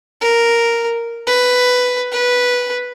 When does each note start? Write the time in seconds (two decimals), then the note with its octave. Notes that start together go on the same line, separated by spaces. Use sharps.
0.21 A#4
1.27 B4
2.12 B4